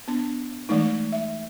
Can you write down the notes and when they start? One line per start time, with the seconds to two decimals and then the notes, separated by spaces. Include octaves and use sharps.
0.08 B3 D4
0.69 E3 G#3 A3 D#4
1.12 E5